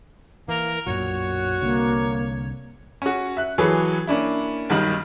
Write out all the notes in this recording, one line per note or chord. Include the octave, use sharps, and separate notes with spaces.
E3 A#3 A#4
B1 F#2 A#2 F#4 C#5
C2 D3 A#3
C#4 F#4
E5 F#6
E3 F#3 G#4 A4 B4 C#5
A#3 C#4 D4 E4
B1 G2 D#3